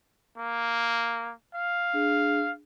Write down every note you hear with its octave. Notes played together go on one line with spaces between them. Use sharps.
A#3
F5
D4 G#4